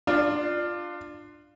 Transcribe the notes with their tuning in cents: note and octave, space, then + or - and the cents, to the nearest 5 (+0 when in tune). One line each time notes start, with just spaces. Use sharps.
D4 +20 F4 +0